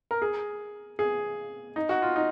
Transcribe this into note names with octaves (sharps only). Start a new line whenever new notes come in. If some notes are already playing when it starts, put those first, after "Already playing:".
A#4
G#4
G#4
D#4
F#4
F4
D#4